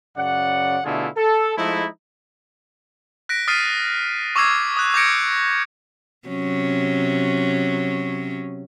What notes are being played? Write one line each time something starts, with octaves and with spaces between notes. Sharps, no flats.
F#2 C#3 D5 F#5
B2 D3 A3 E4 F4 G#4
A4
F3 G#3 A3 D#4 E4
F#6 A#6 B6 D7
D#6 F6 A6 B6 C7 D#7
C#6 D6 E6 G#6 C7
D#6 F#6
D6 G6 G#6 A#6 C#7 D7
C3 F#3 C#4